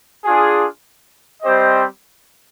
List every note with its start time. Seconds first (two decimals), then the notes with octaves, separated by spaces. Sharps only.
0.24 D4 F4 G#4
1.42 G3 C4 G4 C5 D#5